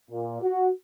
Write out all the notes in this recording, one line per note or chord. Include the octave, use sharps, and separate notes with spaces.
A#2
F#4